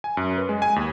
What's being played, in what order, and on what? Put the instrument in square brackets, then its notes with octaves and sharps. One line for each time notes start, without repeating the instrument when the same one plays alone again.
[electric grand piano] G#5
F#2
B4
G#3
G#5
D#2